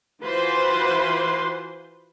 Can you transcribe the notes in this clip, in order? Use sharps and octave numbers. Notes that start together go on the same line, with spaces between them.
E3 F4 F#4 B4 C5 C6